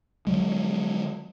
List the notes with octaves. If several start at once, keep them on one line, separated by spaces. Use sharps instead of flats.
D3 F3 F#3 G#3